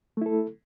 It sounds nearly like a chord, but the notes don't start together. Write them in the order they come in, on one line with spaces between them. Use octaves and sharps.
A3 E4 A4